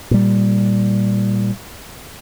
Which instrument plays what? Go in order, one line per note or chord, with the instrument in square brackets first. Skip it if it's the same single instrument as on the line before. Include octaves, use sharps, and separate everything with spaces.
[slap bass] A#2 G3